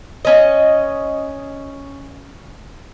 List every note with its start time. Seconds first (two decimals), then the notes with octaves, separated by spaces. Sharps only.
0.25 C#4 D#5